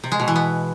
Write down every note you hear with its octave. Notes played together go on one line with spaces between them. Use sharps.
C3
G#3
B2
E3
B3